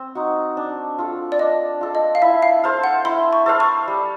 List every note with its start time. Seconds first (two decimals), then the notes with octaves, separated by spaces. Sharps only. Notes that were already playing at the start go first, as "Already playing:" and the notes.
Already playing: C4
0.15 D#4 F#4
0.57 D4
0.98 F4 A4
1.32 D5
1.39 D4 D#5
1.81 F4 A4
1.95 D#5
2.15 F5
2.22 E4 E5
2.42 F5
2.64 A4 C5 F5
2.84 F#5
3.05 E4 C6
3.33 C#6
3.46 A4 C5 F5
3.60 C#6
3.88 G3